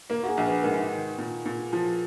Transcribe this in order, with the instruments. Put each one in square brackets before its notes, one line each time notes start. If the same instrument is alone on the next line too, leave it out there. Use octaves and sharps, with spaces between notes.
[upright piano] A#3 [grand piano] A#4
[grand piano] F#4
G#4
[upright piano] A#1
[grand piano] B4
[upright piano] G#2 [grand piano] A#4
[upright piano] D#3
A#2
A#2
F3